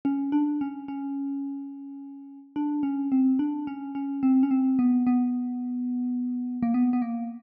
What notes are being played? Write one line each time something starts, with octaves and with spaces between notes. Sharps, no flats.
C#4
D4
C#4
C#4
D4
C#4
C4
D4
C#4
C#4
C4
C#4
C4
B3
B3
A#3
B3
B3
A#3